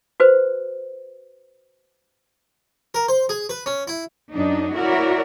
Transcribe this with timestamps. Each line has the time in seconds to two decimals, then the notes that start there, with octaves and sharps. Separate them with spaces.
0.20 F#4 B4 C5
2.94 A#4
3.08 C5
3.29 G#4
3.49 B4
3.66 C#4
3.88 E4
4.34 F#2 D4 D#4
4.75 E4 F#4 A#4 C#5 D5